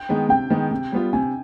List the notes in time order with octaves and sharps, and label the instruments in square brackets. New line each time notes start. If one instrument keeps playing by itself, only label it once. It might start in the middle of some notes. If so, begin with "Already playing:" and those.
Already playing: [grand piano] G5
[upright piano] D#3 G#3 B3
[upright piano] C3 [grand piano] G5
[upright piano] D#3 G#3 B3
C3
G3 B3 F4
[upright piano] C3 [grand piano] G#5